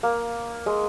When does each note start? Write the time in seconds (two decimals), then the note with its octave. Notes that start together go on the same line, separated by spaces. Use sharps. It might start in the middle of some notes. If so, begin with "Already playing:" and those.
0.03 A#3
0.66 G#3